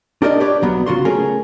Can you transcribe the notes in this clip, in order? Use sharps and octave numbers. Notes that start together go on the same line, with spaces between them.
D4 G4 A#4 C5 D5 D#5
G4 B4 C#5 D5
B1 F#3 B3
C#3 F4 F#4 C6
A3 C#4 G#4 A#4